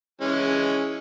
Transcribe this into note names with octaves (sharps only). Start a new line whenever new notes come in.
E3 G#3 C#4